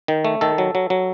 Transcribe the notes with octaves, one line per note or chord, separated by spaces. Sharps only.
D#3
A3
D#3 A4
F#3
F#3
F#3